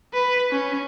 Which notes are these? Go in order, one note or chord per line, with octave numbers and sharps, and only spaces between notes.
B4
C#4